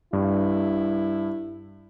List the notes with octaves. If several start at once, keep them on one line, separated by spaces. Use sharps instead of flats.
G2 E4